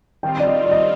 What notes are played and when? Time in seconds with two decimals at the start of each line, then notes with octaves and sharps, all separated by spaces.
0.23 D#3 G3 C4 F4 G5
0.40 D5
0.47 D#5
0.66 D5
0.71 D#5